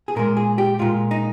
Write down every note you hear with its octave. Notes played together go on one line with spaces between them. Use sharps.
G#4
A#2 G#3 A#4
G#4
G4
A#2 G#3 F4
D#4